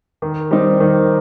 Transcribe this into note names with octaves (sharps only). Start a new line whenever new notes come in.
D#3
G3 C4 D#4
D#3